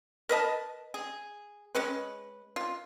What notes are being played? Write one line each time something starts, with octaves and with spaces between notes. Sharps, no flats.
A#4 B4 D#5 A5
G#4
G#3 C#4 B4
F4